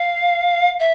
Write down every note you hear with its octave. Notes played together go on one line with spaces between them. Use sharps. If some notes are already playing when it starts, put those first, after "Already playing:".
Already playing: F5
E5